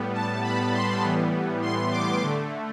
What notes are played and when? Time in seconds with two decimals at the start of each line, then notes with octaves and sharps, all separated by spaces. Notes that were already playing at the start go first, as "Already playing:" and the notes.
Already playing: A2 G3 B3
0.14 A5
0.43 B5
0.73 C6
1.03 A2 E3 G3 B3
1.62 C6
1.92 D6
2.22 D3 A3